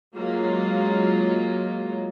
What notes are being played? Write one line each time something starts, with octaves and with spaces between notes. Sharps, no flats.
F#3 G#3 A#3 C#4 F4